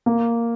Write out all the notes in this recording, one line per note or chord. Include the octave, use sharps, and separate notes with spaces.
A#3